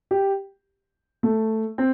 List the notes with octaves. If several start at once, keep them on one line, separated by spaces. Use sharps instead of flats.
G4
A3
C4